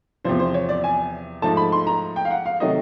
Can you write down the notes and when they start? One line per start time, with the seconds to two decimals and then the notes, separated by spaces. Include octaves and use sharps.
0.25 E2 C3 F3 C5
0.39 C5
0.54 C#5
0.69 D5
0.84 G#5
1.42 G#2 F3 A3 A5
1.57 B5
1.72 C6
1.87 A#5
2.16 G5
2.25 F5
2.31 F#5
2.46 F5
2.60 C3 D#3 F#3 A3 D#5